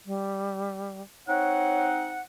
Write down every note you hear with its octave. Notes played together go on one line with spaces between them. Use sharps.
G3
C4 D#4 C#5 F#5